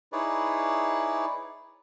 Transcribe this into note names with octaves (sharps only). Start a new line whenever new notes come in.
D#4 E4 G#4 B4 C#5 D5